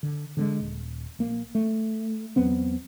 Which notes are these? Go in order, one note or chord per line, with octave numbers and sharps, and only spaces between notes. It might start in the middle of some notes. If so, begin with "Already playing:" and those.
D3
D3 G3 G#3
D#1
A#1 A#3
A3
E2 F#3 B3 C4